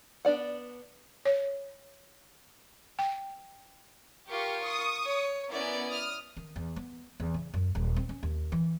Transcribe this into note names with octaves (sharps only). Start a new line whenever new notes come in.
B3 D4 D5 F#5
C#5
G5
F4 G4 A#4 C#6
C#6 D#6
C#5
B3 C#4 E4 A#4 D5
D#6 F6
D#3
E2
B3
E2
C#3
F#2
D#1
C4
C#4
D#2
E3